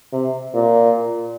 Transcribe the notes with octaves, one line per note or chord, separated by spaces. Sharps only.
C3
A#2